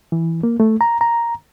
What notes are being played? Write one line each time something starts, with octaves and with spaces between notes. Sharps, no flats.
E3
A#3
A3
A#5
A#5